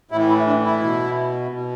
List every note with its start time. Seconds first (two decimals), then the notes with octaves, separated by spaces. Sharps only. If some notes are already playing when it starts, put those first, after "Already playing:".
0.11 A2 E3 E4
0.28 E4
0.47 D4
0.64 E4
0.81 B2
1.51 B2